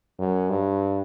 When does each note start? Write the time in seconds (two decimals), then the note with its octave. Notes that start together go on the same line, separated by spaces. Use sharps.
0.19 F#2
0.50 G2